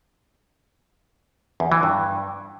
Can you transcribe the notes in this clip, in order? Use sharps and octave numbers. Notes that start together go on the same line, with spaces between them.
E2
E3
G2